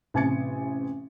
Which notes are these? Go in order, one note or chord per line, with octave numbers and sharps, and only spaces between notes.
A1 C3 G#5 G#6 A6 C#7